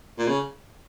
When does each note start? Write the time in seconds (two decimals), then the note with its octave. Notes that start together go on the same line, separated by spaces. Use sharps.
0.19 A#2
0.28 C#3